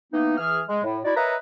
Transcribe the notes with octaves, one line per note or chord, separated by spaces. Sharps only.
E3 A#3 B3 D#4
E3 G#4 F6
G#3
A2
D#4 E4 F#4 D5
A#4 B4 C#5 D#5 E5 A#5